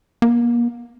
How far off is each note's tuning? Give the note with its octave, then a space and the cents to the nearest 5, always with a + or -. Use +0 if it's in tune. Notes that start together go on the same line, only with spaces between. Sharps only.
A#3 +35